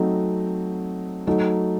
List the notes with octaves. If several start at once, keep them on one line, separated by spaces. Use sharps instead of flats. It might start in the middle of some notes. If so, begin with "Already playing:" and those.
Already playing: F#3 A3 C4 D#4
F#3 A3 D#4